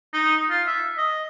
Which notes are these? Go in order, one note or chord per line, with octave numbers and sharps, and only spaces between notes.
D#4
F4
E5
D#5